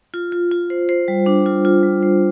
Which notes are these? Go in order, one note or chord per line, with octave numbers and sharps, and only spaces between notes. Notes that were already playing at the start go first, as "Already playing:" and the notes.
F4
F4
F4
C5
C5
G3
D4
F4
F4
G3
C5